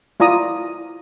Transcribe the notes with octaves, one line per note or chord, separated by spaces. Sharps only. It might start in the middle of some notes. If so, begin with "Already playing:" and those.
E4 F4 D5 A#5 D#6